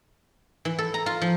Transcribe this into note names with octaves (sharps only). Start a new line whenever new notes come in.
E3
A4
A#5
F4
F3